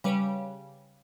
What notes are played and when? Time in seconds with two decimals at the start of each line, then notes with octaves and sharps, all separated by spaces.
0.04 C#3 G3 B4 C#5 D7